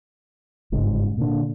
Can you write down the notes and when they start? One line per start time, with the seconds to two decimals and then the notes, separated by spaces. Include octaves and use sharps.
0.72 G1 G#2 C#3
1.17 A#2 D3